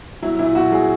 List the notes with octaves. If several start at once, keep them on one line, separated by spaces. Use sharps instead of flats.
F#3 E4
A#2 E4
A#2 F#4
F#3 G#4